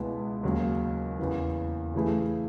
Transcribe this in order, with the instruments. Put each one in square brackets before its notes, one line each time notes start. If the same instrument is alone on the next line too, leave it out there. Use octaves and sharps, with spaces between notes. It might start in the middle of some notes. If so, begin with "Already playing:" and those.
Already playing: [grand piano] C#2 B2 G#3 B3 E4
D#2 C#3 F#3
E2 C#3 E3
C#3 E3 A3 E4 G#4